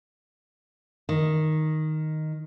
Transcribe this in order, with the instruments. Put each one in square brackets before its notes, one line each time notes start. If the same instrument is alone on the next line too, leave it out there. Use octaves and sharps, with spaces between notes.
[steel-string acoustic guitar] D#3